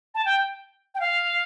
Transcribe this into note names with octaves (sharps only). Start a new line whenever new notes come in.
A5
G5
G5
F5